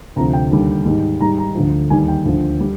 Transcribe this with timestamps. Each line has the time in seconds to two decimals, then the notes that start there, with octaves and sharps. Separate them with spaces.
0.16 D2 C3 F3 A#5
0.33 G5
0.51 D#2 D3 G3
0.85 G#2 D#3 G3
1.21 G#2 D#3 G3 A#5
1.38 A#5
1.55 D2 D3 F3
1.90 D#2 D#3 G3 G#5
2.08 G5
2.25 D2 D3 F3
2.61 G3